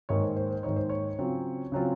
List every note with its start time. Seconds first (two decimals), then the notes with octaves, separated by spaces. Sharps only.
0.09 G#2 D#3 A#3 D#4 C#5
0.23 C5
0.36 C5
0.51 C5
0.63 G#2 D#3 A#3 D#4 C#5
0.76 C5
0.89 C#5
1.18 C#3 F#3 C4 F4
1.72 C#3 F#3 C4 F4